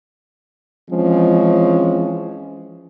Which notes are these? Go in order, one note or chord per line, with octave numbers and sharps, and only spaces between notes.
E3 F3 G#3 C4 C#4